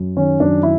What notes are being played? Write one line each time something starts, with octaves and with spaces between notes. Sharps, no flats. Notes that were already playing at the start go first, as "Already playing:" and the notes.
Already playing: F#2
D#3 C#4
F#2 D4
D#3 E4